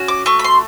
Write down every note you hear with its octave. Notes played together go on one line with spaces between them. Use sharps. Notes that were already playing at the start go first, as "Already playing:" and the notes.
Already playing: C#4 F#4
D6
A3 C#6
B5
C6